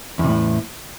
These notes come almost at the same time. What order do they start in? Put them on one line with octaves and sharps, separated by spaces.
E2 C3 A2